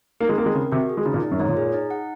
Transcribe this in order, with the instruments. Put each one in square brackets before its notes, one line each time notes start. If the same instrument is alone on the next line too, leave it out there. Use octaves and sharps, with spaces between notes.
[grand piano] A#3 [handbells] D#4
[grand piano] G#3
[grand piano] A#3 [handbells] C4
[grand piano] G#3
[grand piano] C#3 [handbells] A#4
[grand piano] C3 [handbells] F#4
[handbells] G#4
[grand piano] G#3
[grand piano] C#3 [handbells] D#4
[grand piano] A#2
[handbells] D#4
[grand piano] F#2
[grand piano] G#2 [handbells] C#5
[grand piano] A#2
[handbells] G#4
D#4
F#5